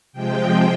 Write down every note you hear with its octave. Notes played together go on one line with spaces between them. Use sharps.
C3 F3 G#3 G5